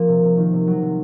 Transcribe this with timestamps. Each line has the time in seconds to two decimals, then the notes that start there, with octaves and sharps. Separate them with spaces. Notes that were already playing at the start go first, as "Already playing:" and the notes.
Already playing: F3 A#3
0.08 C3
0.23 C3
0.37 D#3
0.53 C3
0.67 F#3
0.82 C3